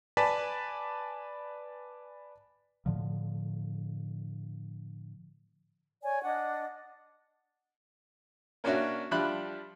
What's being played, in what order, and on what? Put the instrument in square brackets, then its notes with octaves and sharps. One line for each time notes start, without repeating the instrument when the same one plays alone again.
[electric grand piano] B4 D5 G#5 A5 B6
[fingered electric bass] A2 D3 F3
[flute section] C#5 D5 G#5
D4 D#5 F#5
[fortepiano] A#3 C#4 D4 F#4 C#5 E5
F3 G3 D4 E5 B5 F#6